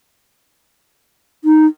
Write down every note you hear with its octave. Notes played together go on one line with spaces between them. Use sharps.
D#4